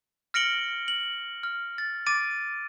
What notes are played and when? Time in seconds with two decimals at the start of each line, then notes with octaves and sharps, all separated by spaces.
0.34 F6 A#6 C#7 D7 F#7 G7
0.88 F#7
1.43 F6
1.78 A6
2.06 D6 A6 D7 D#7